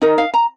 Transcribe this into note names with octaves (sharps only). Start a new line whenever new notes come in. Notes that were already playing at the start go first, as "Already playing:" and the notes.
D#4 A#4 D#5
F5
A#5